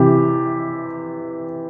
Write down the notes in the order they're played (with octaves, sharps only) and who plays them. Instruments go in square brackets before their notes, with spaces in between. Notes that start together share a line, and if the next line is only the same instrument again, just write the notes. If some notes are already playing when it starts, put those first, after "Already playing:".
Already playing: [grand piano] C3 E3 G4